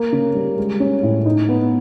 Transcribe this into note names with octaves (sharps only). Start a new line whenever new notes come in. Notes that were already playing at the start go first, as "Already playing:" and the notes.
Already playing: A#3
C#3
G3
G#3
C#4
A2
D#4
B3